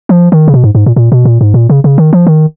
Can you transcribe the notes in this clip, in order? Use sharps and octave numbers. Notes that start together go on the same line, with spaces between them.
F3
D#3
C#3
B2
G#2
G#2
A#2
A#2
B2
A#2
G#2
A#2
C#3
C#3
D#3
F3
D#3